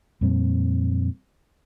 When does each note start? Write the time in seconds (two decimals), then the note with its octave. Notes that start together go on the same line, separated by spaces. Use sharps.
0.21 F2 A#2 G3 C4